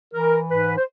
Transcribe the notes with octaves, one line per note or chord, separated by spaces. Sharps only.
E3 A#4
G#2 B4
C5